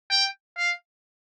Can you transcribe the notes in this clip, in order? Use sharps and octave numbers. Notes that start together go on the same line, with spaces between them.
G5
F5